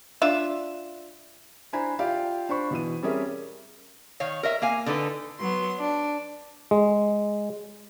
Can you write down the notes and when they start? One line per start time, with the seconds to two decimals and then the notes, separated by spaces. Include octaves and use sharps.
0.22 D4 F4 E5
1.73 D4 E4 C5 G#5 A#5 B5
1.99 F4 G4 D5 E5 F5 G5
2.49 D4 C5 B5 C#6
2.71 B2 E3 D#7
3.03 G3 C4 C#4 G#4 A#4 E5
4.20 D#3 C#5 F5
4.43 A#4 D#5 E5
4.62 A#3 F5 G#5
4.86 D3 D#4 A4 B4
5.38 F#3 B3 C6
5.79 D4
6.71 G#3